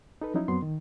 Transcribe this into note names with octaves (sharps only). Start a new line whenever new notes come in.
D#4 A4 B4
F3 F#3 C#4 D#4 E4
F#2 F#3 B3 C4 C6
D#3